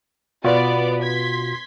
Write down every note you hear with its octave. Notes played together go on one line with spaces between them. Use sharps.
B2 B3 F4 F#4 D5
C6 G#6 B6